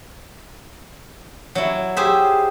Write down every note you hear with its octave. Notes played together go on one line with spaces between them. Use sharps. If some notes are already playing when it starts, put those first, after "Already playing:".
F#3 E4
G4 G#4 C5 E5